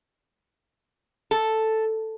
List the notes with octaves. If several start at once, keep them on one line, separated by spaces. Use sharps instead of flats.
A4